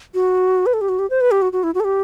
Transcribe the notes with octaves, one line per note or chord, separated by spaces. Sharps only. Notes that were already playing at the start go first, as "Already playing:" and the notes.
F#4
B4
A4
G4
F#4
G4
C5
B4
G4
F#4
F#4
E4
F#4
A4
G4